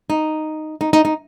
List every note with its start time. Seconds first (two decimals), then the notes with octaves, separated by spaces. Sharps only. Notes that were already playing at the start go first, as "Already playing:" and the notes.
0.10 D#4
0.81 D#4
0.93 D#4
1.05 D#4